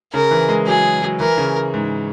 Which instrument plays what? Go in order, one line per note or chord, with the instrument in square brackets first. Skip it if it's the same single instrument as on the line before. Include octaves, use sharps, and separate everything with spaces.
[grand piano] C#3 [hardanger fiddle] A#4
[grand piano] E3
G#3
[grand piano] F#3 [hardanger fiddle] G#4
[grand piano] F#3
[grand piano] E3 [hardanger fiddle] A#4
[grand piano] C#3
G#2